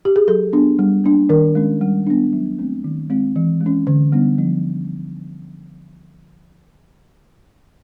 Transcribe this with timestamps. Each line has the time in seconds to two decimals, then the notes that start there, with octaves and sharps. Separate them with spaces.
0.05 G4
0.16 G#4
0.27 F#3 A4
0.53 B3 D4
0.79 G3
1.04 A#3 D4
1.29 D#3 A#4
1.55 G#3 C#4
1.81 G3
2.07 B3 D4
2.33 F#3
2.58 A3 C4
2.84 D#3
3.10 G#3 C4
3.36 E3
3.61 G#3
3.66 C#4
3.87 D3
4.12 G3 B3 D4
4.38 F3